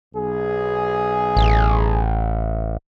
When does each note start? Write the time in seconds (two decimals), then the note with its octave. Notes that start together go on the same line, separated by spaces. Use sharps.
0.15 B1 G#4
1.36 A1